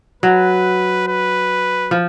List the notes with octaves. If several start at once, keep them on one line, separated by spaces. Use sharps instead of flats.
F#3 B4
B4
F3